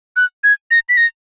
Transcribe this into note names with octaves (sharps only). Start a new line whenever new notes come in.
F#6
G#6
A#6
B6
A#6